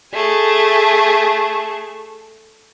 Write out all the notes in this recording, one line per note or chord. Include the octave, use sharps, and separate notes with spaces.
A3 G#4